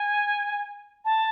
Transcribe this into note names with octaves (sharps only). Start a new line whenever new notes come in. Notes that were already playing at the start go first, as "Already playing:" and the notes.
Already playing: G#5
A5